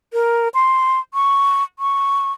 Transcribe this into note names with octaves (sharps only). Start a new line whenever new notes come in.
A#4
C6
C#6
C#6